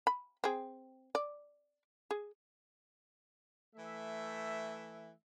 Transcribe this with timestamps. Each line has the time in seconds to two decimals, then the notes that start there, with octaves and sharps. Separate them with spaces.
0.07 B5
0.44 C4 G#4
1.15 D5
2.11 G#4
3.76 E3 A3 E5